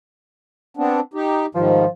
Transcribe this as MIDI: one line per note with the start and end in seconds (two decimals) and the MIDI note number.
0.77 1.00 59
0.77 1.00 60
0.77 1.00 62
1.14 1.46 63
1.14 1.46 67
1.55 1.85 44
1.55 1.85 51
1.55 1.87 53
1.55 1.85 55